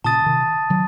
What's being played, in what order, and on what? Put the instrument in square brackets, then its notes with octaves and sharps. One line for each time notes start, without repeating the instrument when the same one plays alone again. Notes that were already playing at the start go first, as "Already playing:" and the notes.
[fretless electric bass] A#2 C#3 [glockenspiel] A5 D#6 A6 D#7
[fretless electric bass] C3 D#3
D#3 F#3